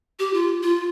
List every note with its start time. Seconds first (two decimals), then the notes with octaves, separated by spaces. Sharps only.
0.19 G4
0.33 F4
0.63 F4